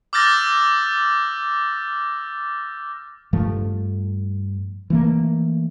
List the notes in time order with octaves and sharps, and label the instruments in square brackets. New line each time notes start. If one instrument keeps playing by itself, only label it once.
[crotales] D6 E6 F6 G6 A6 A#6
[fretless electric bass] G2 F3 A3
E3 A3 A#3